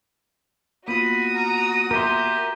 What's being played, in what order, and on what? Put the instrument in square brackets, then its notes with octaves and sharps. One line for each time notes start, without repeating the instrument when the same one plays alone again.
[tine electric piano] A#3 B3 F4 [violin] F#4 D#6 [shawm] B5
[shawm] A#5
[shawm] G4 [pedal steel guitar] A#4 E5 C6